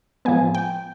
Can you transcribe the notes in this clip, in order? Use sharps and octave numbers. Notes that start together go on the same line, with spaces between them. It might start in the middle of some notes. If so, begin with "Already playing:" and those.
A2 F3 G#3 B3 G#5
G5